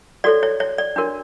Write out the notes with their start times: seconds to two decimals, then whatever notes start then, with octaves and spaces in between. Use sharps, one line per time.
0.24 F#4 A4 C#5 D5
0.43 C#5
0.60 C#5
0.78 D5
0.96 D4 F#4 A#4 C#5